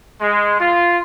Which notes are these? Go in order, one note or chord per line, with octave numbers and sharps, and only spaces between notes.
G#3
F4